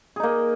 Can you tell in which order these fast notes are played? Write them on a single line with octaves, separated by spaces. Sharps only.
G#4 D#4 A#3